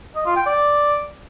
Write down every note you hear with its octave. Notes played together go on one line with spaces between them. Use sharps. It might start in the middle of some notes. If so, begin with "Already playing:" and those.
D#5
F4
G5
D5